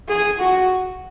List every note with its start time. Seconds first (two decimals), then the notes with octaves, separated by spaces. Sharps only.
0.09 G#4
0.39 F#4